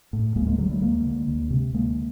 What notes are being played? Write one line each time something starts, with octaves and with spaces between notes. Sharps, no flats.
A2
D2 G#3 A#3
G#3 A#3
D3 F#3 G#3
G3 A3
D2 G#3 A#3
D3
D2
C3
D2 G#3 A#3